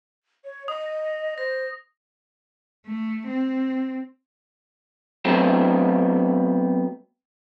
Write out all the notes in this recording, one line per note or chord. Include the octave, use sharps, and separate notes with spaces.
C#5
D#5 D#6
C5 A#6
A3
C4
F#3 A3 B3 C4